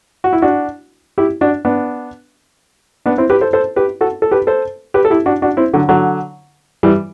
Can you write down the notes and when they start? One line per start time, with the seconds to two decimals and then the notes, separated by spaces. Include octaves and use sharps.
0.24 F#4
0.33 E4
0.42 D4 F#4
1.18 E4 G4
1.41 D4 F#4
1.65 B3 D4
3.06 B3 D4
3.18 C4 E4
3.30 G4 B4
3.41 A4 C5
3.53 A4 C5
3.76 G4 B4
4.01 F#4 A4
4.22 A4
4.31 G4 B4
4.47 A4 C5
4.94 G4 B4
5.05 A4
5.10 E4 G4
5.26 D4 F#4
5.42 D4 F#4
5.57 C4 E4
5.74 D3 F#3
5.89 D3 F#3
6.83 E3 G3